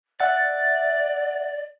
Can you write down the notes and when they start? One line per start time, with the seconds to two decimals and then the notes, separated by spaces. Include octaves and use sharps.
0.20 D5 E5 F#5 A6